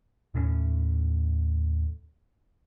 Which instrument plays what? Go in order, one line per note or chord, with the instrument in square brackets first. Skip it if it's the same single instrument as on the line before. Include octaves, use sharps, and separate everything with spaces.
[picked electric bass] D#2 A2 G#3 C#4